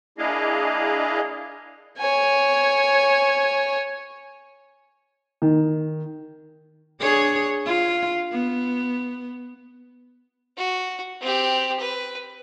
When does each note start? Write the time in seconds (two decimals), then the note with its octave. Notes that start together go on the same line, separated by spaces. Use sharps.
0.18 A#3 D4 E4 G#4 D#5 F5
1.99 C#5 G#5
5.42 D#3
7.00 D4 G#4 C#5
7.65 F4
8.32 B3
10.57 F#4
11.21 C4 G4
11.79 B4